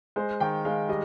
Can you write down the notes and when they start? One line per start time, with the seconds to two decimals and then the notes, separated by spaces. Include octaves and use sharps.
0.16 G#3 C5
0.40 D#3 G5
0.65 G#3 F5
0.89 G3 D#5